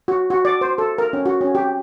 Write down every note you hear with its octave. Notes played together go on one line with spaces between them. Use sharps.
F#4
F#4
D5
C5
A4
A#4
C#4
F#4
C#4
G4